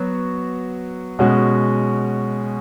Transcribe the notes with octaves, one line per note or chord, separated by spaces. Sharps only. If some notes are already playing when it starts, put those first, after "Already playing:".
Already playing: F#3 B3 F#4
B2 G#3 C#4 F#4